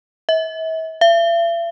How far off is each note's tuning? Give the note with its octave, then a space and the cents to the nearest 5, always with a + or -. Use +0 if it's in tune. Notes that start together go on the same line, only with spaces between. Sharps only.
E5 -40
E5 +45